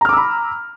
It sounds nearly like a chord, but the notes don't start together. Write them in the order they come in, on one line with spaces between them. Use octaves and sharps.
A#5 F6 D6 E6 B5